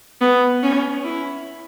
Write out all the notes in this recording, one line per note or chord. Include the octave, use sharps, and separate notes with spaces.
B3
C#4
E4